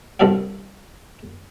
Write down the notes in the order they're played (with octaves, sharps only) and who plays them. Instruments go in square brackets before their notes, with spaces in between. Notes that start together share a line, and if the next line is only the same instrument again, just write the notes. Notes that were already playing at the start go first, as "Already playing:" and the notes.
[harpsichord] C2 G2 A4 D5 F5 F#5